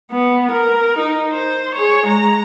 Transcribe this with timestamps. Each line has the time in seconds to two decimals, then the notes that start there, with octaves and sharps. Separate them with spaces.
0.11 B3
0.52 A#4
0.99 D#4
1.32 C5
1.75 G#4 C#5
2.06 G#3 A#5